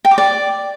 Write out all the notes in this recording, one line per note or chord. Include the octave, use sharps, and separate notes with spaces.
G5
D6
D5